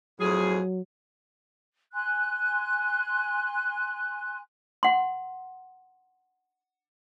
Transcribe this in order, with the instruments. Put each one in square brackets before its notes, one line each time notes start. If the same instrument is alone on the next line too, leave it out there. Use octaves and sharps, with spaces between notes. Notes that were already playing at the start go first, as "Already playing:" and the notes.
[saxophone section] F2 A2 G#4 [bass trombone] F#3
[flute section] G#5 C6 F#6
[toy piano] F#5 C6